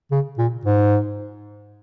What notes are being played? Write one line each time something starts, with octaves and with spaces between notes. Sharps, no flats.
C#3
A#2
G#2